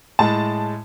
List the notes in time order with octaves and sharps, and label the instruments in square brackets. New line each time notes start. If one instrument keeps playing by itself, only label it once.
[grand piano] A2 G#3 [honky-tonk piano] A5